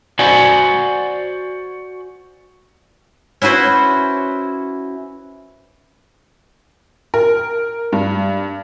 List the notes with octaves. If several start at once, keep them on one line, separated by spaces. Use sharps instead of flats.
F#4 C5 D5 F#5 G#5
C#4 E4 F#4 B4 C5
A#4
G2